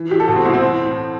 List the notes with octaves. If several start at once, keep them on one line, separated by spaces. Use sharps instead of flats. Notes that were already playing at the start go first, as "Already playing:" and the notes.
Already playing: E3
E3 G4
A4
B2 F#4
C4
C2 E4
C4
E3
A2